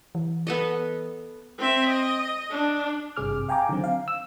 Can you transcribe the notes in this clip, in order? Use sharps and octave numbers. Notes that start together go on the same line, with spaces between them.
E3
B3 A4 D#5
C4 E5
D#5
D4
G#1 G2 C3 G#4 D6 F6
F5 G5 G#5 A#5 D6
D3 D#3 F#3 C4
F5
E6